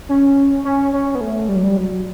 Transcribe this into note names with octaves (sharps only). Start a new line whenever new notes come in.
C#4
C#4
C#4
B3
A3
G3
F#3
G3
F#3